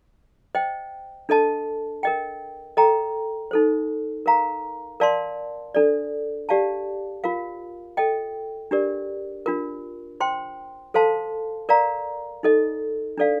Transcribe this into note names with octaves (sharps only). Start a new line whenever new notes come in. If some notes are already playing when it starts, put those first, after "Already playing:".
C5 D#5 G5
D4 A4 D#5 A5
A#4 D#5 G5
A4 D#5 G5 A#5
D#4 A4 C5
A#4 F5 A#5
A#4 D5 F5 A5 C6
D4 A4 D5
G4 D5 F5 A5
F4 A#4 F5
A4 D#5 G5
D4 G4 A#4 D5
D4 F4 A#4
C5 G5 C6
A4 C5 F5 A5 C6
A#4 D5 F5 A#5
D#4 A4 D#5
D4 A4 D5 F5